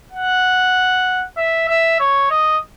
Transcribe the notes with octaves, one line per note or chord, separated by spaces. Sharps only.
F#5
E5
E5
C#5
D#5